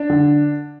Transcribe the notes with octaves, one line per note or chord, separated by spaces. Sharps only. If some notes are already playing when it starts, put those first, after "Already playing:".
Already playing: D4
D3